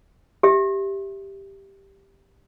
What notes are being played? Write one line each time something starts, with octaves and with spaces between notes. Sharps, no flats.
G4 E5